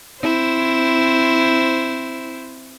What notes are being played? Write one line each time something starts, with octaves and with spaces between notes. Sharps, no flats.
C4 E4 C5